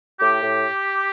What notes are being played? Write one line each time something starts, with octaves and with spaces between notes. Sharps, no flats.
A2 G4
A2